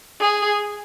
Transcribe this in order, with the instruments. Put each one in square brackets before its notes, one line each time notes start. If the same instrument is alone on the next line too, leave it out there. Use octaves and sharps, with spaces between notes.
[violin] G#4